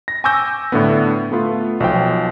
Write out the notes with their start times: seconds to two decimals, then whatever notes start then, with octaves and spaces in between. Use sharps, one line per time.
0.08 A#6
0.24 G#5 C#6 D6 E6 G6 A#6
0.72 A2 D3 B3
1.32 A3 B3 F4
1.80 B1 F3 G5